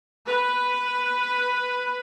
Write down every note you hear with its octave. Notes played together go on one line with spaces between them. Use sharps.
B4